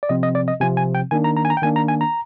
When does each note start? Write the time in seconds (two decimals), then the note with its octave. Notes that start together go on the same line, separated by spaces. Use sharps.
0.03 D5
0.09 C3 F3 C4 D#5
0.23 D#5
0.35 D5
0.48 D#5
0.60 C3 F3 C4 G#5
0.77 G#5
0.95 G5
1.11 D#3 A#3 D4 G#5
1.24 A#5
1.37 A#5
1.45 G#5
1.50 A#5
1.57 G5
1.62 D#3 A#3 D4 G#5
1.76 A#5
1.88 G#5
2.01 A#5